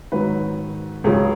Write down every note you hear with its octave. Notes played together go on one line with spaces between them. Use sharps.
G#2 D#3 F#3 B4
C#2 C#3 F#3 G#4